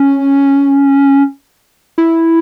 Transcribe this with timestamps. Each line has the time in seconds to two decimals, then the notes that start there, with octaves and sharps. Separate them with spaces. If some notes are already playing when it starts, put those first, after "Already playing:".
Already playing: C#4
1.98 E4